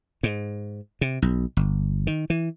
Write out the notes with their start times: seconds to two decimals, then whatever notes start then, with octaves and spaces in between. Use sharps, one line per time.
0.23 G#2
1.01 C3
1.22 B1
1.57 G1
2.07 D#3
2.30 E3